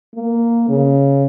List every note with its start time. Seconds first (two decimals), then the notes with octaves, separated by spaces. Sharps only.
0.15 A#3
0.69 C#3